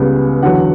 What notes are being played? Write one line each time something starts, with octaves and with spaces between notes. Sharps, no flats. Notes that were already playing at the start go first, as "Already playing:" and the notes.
Already playing: C#2 C#3 G3 B3
E2 D3 F#3 F#5